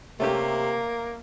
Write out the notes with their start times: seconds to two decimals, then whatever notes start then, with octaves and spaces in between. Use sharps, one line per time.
0.20 C3 A3 A#3 C#4 G4